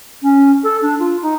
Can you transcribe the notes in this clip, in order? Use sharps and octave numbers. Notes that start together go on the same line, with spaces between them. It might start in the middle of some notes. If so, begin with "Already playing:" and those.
C#4
A4
D4
F4
D#4